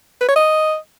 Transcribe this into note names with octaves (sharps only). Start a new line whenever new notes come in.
B4
C#5
D#5